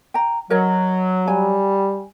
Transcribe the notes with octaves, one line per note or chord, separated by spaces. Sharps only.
G5 A#5
F#3 A#4 C#5 D#5
G3 G#5